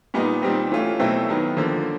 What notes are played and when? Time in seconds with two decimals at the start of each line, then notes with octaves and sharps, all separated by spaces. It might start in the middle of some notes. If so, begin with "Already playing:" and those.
0.14 A#2 G3 B3 D#4
0.42 A#2 G3 C4 D#4
0.71 E3 A3 C#4 F4
0.99 B2 F#3 A3 C4 E4
1.29 D#3 F#3 B3
1.57 D3 F3 A#3